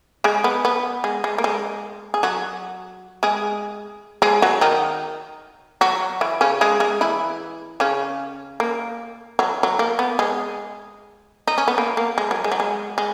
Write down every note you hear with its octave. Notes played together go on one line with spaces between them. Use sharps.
G#3 G#4
B3
B3
G#3
G#3
A#3
G#3
G#4
F#3 F#4
G#3 G#4
G#3 G#4
F#3 F#4
D#3 D#4
F#3 F#4
E3 E4
C#3 C#4
G#3 G#4
G#3 G#4
E3 E4
C#3 C#4
A#3
F#3
F#3
A#3
B3
G#3
D#4
C#4
B3
A#3
A#3
G#3
F#3
G#3
F#3
G#3
G#3